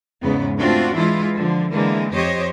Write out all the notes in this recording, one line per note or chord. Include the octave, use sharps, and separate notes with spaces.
E2 G#2 C#3 B3
A3 C4 D4 F4 F#4
E3 G#3 E4 F4
D3 F3
D3 E3 G#3 A#3
F2 G4 C5 C#5 D#5